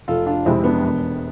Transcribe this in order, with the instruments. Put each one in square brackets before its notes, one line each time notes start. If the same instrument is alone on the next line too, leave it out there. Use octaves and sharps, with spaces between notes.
[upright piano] F1 [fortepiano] F4 A4
[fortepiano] D4 F4
[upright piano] F2 C3 G#3 [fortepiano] C4 E4
[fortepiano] B3 D4
[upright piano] E1